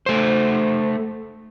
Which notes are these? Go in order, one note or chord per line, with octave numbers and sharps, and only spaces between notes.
A3 C5